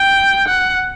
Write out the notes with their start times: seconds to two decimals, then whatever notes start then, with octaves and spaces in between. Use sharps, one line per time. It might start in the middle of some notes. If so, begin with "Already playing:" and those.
Already playing: G5
0.48 F#5